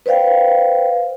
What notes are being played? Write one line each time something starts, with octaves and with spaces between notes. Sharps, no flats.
B4 C5 D5 F5 G5